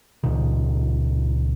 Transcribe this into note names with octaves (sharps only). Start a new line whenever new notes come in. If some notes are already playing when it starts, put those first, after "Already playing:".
C#2 A#2 D#3